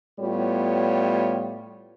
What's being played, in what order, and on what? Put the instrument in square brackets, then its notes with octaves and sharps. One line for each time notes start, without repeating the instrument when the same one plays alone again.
[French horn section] A2 G3 B3 F4 C#5